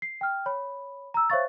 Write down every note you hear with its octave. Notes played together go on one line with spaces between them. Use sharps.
C7
G5 F6
C#5 B5
A#5 E6
C5 C#5 E5 F5 C#6 A6